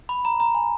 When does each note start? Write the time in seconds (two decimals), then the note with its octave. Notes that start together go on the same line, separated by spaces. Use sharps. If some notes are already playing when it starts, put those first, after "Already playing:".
0.09 B5
0.25 A#5
0.40 A#5
0.55 G#5